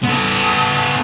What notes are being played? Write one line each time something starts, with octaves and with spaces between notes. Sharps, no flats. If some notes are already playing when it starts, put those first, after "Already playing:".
B3 A4